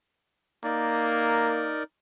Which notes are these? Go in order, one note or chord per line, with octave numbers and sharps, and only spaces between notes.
A#3 D#4 A#4 D5